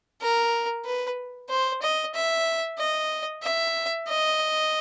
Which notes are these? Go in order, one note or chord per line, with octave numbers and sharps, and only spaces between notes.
A#4
B4
C5
D#5
E5
D#5
E5
D#5